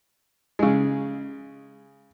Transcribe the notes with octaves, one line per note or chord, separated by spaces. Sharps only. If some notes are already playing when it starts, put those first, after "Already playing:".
C#3 G#3